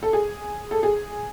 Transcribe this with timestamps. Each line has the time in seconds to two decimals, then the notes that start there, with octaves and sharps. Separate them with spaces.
0.03 A4
0.13 G#4
0.71 A4
0.83 G#4